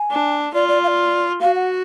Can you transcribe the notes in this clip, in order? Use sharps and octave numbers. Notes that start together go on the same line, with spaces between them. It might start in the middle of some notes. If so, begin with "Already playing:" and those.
Already playing: G#5
D4
F4 D5
D5
F5
D5
F#4 F5
F#5